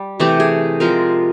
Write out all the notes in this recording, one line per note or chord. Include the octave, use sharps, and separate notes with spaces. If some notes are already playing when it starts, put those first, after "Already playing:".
Already playing: G3
C3 E3 A3 G4
G#4
F3 G#3 C4 F4 A#4